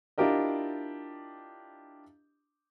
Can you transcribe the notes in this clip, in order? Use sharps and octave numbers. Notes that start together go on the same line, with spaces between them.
D4 E4 F4 G4 A#4 D#5